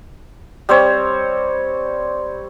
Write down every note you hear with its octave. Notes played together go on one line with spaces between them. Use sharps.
G3 C4 C5 C#5